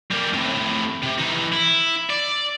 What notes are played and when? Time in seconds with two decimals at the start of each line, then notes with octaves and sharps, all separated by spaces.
0.11 G3 A#3
0.34 A2 C3
1.03 C3
1.19 E3 D#4
1.53 E4
2.10 D5